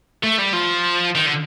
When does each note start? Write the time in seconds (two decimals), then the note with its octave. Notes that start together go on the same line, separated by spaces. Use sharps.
0.23 A3
0.39 G3
0.53 F3
1.15 D#3
1.26 D3